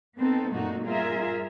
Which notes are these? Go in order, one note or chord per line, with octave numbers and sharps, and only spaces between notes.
B3 C4 D#4 A4
F#2 A#2 A3 A#3 D#4 F#4
G2 F4 G#4 A#4 E5